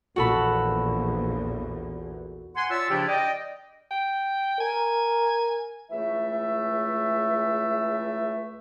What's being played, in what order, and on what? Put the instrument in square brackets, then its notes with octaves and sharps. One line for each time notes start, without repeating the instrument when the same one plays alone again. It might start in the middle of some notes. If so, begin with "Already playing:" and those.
[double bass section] A#1 E2 [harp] F#4 A4 B5
[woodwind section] F#5 G#5 C6
F4 C#5 D5 E5 A5 E6
C#3 F3 D4 E4 F4 G4
D5 D#5 G5
[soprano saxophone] G5
[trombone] A#4 [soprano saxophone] G#5
[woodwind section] C#2 E3 A3 E5